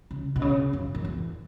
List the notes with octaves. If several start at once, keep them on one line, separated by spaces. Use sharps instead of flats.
C#3
B2
C#3
F#2
F#2
E2